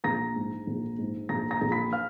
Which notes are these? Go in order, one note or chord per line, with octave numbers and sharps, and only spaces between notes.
A#1 A#5 A#6
G#2
A#1
G#2
A#1 A#5 A#6
A#5 A#6
A#1
B5 B6
F5 F6